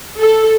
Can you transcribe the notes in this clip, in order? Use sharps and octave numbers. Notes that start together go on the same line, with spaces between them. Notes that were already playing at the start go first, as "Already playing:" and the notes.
A4